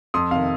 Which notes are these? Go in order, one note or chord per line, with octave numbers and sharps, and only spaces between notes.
F2 C6 D#6
C3 D#3 F5